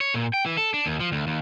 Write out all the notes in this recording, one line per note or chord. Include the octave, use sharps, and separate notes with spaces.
C#5
A#2
G5
E3
A4
D4
D#2
F3
D2
D#2